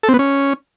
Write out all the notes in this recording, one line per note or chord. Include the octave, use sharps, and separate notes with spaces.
A4
C4
B3
C#4